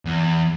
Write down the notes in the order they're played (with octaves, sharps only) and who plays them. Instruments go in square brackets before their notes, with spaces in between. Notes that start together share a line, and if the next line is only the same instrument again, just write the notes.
[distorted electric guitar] E2